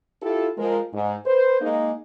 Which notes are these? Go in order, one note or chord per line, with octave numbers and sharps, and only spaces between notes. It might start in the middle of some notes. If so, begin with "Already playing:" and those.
E4 F4 G4 A4
F3 G#3 A#4
G#2
B4 C5
G#3 A#3 D#4